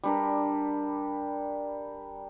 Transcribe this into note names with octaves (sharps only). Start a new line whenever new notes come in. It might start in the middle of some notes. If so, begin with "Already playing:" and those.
G3 D4 A#4